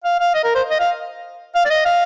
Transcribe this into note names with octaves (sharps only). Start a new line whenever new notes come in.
F5
F5
D#5
A#4
C5
D#5
F5
F5
D5
D#5
F5